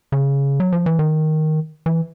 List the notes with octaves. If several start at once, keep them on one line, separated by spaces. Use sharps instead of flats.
C#3
F#3
F3
E3
D#3
E3